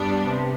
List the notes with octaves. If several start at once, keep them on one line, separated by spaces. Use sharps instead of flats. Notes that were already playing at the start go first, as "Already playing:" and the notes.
Already playing: G2 G3 B3 D4
C3